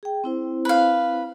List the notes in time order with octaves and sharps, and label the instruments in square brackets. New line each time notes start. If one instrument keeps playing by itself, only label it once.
[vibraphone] G#4 G5
C4 E4 C5
[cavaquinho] B4 F5